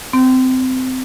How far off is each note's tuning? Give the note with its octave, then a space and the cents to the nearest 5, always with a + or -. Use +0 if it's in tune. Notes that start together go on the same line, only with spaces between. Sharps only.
C4 -20